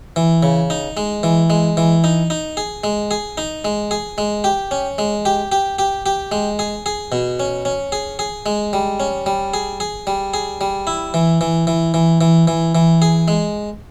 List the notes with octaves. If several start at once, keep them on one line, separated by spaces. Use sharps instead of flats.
E3
C#3
D#4
G#3
E3
G#3
E3
D#4
D#4
G#4
G#3
G#4
D#4
G#3
G#4
G#3
G4
C#4
G#3
G4
G4
G4
G4
G#3
G#4
G#4
B2
C#4
C#4
G#4
G#4
G#3
G3
C#4
G3
G#4
G#4
G3
G#4
G3
E4
E3
E3
E3
E3
E3
E3
E3
G#4
G#3